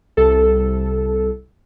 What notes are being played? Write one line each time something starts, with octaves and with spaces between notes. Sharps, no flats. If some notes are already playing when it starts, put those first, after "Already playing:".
C2 A4